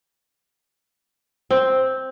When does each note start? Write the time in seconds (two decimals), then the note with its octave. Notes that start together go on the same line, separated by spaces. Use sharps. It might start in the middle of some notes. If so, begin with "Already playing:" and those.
1.51 C4